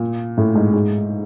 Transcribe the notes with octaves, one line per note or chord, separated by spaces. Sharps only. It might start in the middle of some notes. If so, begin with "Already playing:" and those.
Already playing: A#2
A2
G#2
G#2